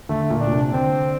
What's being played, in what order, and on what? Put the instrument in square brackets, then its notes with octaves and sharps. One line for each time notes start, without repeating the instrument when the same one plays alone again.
[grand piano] D3 [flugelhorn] A3
[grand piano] A#2
[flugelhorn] D4
[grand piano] A#2
C3
[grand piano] D3 [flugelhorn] C4